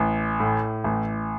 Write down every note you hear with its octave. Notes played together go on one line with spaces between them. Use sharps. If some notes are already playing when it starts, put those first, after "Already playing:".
Already playing: A1
A2
A1